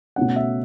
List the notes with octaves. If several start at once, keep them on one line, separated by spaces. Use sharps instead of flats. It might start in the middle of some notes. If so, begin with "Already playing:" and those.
B2 A3 C#4 F#5
E5